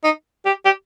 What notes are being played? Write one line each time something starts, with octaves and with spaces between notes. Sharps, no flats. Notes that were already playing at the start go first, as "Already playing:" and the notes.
D#4
G4
G4